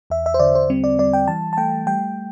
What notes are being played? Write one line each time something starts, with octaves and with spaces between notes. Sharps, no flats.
E2 E5
E5
C5
D3 D5
C5
G3 C4
D5
G3 D5
G5
E3 A5
A5
A3 G5
G3 G5